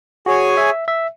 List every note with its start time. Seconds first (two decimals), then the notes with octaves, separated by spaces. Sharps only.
0.26 F#4 G#4 C#5 G#5
0.57 E5
0.88 E5